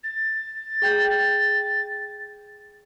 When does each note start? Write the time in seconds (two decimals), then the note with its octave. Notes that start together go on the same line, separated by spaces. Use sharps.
0.03 A6
0.82 G#4 G5 G6